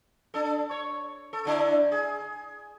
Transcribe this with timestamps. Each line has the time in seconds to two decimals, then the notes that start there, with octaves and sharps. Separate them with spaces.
0.34 D4 A4
0.71 C#5
1.33 A4
1.45 D3 D4 E4
1.92 G#4